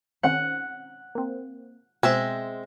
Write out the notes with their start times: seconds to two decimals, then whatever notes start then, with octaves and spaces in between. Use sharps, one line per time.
0.23 D#3 C4 C#4 F#5
1.15 A#3 C4
2.03 B2 G#3 C4 E5